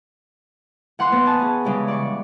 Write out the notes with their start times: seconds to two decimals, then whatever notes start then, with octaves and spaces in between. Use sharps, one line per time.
0.99 E3 F#5 C6 F#6
1.11 E3 B3 B4
1.26 G#5 A5 D#6
1.40 C#4 G#4
1.64 C#3 E3 G3 G#3
1.88 D5 C#6